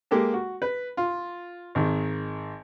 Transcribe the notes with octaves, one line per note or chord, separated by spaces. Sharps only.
G#3 A#3 G4 A4
F#4
B4
F4
G#1 D#3